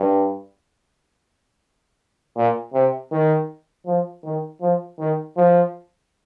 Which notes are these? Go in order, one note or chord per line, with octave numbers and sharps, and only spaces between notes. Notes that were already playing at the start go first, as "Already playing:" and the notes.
Already playing: G2
A#2
C3
D#3
F3
D#3
F3
D#3
F3